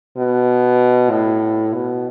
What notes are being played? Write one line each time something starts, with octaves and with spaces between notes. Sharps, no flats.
B2
A2
B2